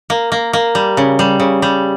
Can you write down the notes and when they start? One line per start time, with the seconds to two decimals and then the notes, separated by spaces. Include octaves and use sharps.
0.10 A#3
0.32 A#3
0.53 A#3
0.75 G3
0.97 C#3
1.19 G3
1.40 C#3
1.62 G3